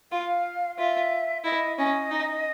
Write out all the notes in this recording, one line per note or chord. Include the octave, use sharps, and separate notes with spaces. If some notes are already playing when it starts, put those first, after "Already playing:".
F4 F5
F4 E5
E4 D#5
C#4 D#5
D#4